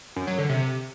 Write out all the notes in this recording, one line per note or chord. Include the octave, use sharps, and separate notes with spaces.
F#2
F#3
D3
C3